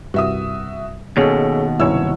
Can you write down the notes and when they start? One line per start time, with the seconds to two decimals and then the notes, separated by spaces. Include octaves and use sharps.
0.14 C2 G2 F#4 E5 D#6
1.17 D#2 B2 C#4 G#4 A4 C#5
1.80 F#1 C2 G2 E4 C#5 E6